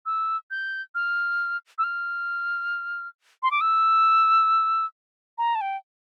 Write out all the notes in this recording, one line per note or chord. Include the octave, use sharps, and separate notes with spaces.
E6
G6
F6
E6
F6
C6
D6
E6
A#5
A5
G5